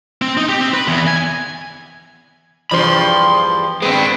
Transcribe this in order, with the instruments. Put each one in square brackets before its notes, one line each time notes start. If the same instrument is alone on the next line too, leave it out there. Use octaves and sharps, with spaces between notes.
[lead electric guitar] C4
D#4
G4
C4
B4
E2
G#5
[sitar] E2 G2 F3 [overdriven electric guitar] B5 C6
[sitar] G2 B3 [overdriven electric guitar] G#3 C4